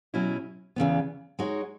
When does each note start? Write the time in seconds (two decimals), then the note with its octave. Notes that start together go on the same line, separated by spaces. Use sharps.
0.14 B2 F#3 C#4 E4
0.76 E2 C#3 E3 B3
1.39 G#3 D#4 F#4 C#5